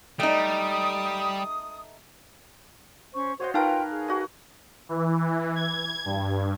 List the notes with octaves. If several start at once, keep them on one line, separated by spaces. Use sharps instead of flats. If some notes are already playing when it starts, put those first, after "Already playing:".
G3 A3 D#4 D#6
C#4 C5 C#6
F#4 C5 C#5 D#5 G5
D#4 F4 A#4 B4 F5 G5 A5
G#4
F#4 D#5
E3
E3
G#6
G2